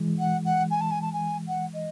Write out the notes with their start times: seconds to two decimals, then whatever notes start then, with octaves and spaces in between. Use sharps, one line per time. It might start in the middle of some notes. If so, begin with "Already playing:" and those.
Already playing: E3 G#3
0.18 F#5
0.45 F#5
0.70 G#5
0.80 A5
0.91 G#5
1.01 A5
1.12 G#5
1.47 F#5
1.73 D#5